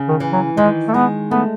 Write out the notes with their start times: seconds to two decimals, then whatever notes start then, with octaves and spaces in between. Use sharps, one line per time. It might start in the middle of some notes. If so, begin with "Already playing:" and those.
Already playing: C#3
0.09 D#3
0.20 E3
0.33 F#3
0.57 D#3 G#3
0.88 A3
0.94 G#3 B3
1.31 A3 B3